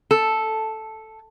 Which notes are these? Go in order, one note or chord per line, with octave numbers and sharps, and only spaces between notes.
A4